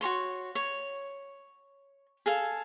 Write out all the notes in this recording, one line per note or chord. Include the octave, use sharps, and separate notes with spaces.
F#4 A4 C#5 C6
C#5
G#4 A4 F5